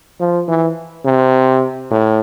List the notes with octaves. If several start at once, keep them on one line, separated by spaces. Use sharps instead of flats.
F3
E3
C3
A2